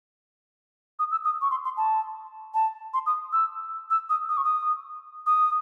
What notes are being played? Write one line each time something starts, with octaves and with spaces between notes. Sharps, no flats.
D#6
E6
D#6
C#6
C6
C6
A5
A5
C6
D#6
E6
E6
D#6
D#6
C#6
D#6
D#6